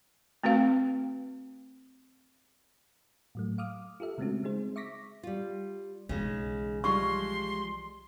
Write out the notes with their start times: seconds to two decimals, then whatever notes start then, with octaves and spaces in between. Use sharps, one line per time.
0.43 A3 C4 F#4 B4 F5
3.35 A2 F#3 A3
3.58 F5 D6 D#6 F6
4.00 F4 G4 A4 E5
4.18 C#3 G#3 A3 C4 C#4 F#4
4.44 G#3 C4 D#4 G#4 C5
4.76 E5 C#6 D6 A#6 B6
5.23 G3 F4
6.09 B1 C#3 E3 G#3 D#4
6.84 F3 G3 G#3 C6 C#6